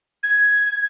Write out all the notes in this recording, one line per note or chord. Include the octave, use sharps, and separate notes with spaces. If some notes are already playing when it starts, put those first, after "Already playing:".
G#6